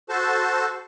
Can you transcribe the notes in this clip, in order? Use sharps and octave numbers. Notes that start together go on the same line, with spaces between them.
F#4 A4 C5 A5